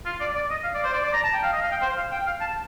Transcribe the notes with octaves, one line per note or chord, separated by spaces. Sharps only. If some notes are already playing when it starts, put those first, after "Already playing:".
F4
D5
D5
D#5
F5
D5
C5
D5
D5
A#5
A5
G5
F5
D#5
F5
G5
C5
F5
G5
F5
A5